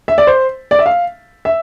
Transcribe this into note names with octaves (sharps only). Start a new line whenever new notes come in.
E5
D5
C5
D5
E5
F5
E5